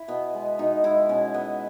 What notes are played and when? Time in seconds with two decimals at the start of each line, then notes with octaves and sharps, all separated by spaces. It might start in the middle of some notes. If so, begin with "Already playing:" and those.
Already playing: E4
0.08 B2 B3
0.34 G#3
0.59 B2 D#4
0.84 G#3 E4
1.09 B2 C#4
1.34 G#3 B3